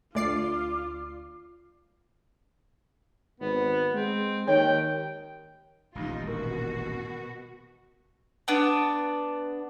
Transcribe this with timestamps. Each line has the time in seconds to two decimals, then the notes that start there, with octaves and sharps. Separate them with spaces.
0.15 D2 F4 D5 D6 C7
3.40 G#1 B3
3.94 G#3 C4
4.48 D#2 D#3 C#5 G5
5.95 D#1 A1 G2 G3 D#4 F4
6.27 B2 F#4 A#4
8.48 B3 D4